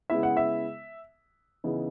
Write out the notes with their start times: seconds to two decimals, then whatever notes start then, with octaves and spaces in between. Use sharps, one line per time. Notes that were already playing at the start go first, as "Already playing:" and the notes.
0.10 C#3 G#3 B3 E4 E5
0.23 F#5
0.37 E5
1.64 C#3 E3 B3 D#4